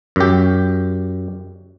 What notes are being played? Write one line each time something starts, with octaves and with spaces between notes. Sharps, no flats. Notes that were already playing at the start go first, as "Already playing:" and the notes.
F#2 G4